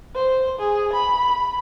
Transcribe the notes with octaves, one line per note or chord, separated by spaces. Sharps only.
C5
G#4
B5